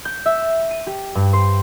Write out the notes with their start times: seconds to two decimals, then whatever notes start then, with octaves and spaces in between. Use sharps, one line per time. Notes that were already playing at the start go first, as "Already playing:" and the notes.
0.05 G6
0.26 E5
0.71 D#7
0.87 G4
1.15 G2
1.33 C5